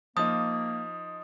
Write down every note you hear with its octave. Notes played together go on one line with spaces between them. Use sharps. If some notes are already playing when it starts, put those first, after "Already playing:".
F3 A#3 D#4 D#6